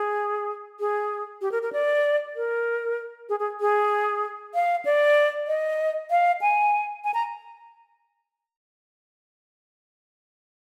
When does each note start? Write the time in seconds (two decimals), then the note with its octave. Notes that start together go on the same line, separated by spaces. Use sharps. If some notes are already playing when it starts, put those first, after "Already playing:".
Already playing: G#4
0.80 G#4
1.41 G4
1.52 A#4
1.62 A#4
1.73 D5
2.36 A#4
3.29 G#4
3.40 G#4
3.60 G#4
4.54 F5
4.85 D5
5.47 D#5
6.10 F5
6.41 G#5
7.04 G#5
7.14 A#5